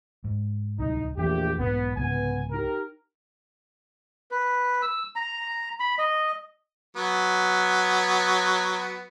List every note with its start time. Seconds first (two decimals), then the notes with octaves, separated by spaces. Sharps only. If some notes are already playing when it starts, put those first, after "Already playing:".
0.24 G#2
0.79 D1 C2 D#4
1.17 A#1 E2 E3 A3 B3 G4
1.59 B1 G#2 B2 B3
1.97 C2 G#2 C#3 B3 G#5
2.52 D#4 G4 A#4
4.31 B4
4.82 E6
5.16 A#5
5.80 B5
5.98 D#5
6.97 F#3 B3